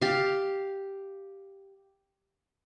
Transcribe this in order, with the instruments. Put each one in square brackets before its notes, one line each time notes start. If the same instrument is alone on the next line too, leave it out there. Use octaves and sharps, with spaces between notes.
[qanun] G4 F5